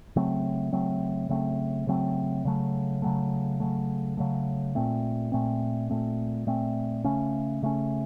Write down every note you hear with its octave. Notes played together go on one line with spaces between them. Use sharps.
C#3 F#3 A3 C4
C#3 F#3 A3 C4
C#3 F#3 A3 C4
C#3 F#3 A3 C4
C#3 F#3 A3
C#3 F#3 A3
C#3 F#3 A3
C#3 F#3 A3
A#2 A3 C4
A#2 A3 C4
A#2 A3 C4
A#2 A3 C4
C#3 A3 C#4
C#3 A3 C#4